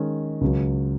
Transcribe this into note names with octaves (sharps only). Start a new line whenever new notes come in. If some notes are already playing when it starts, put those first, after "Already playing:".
Already playing: D#3 G#3 C#4
C#2 C#3 F#3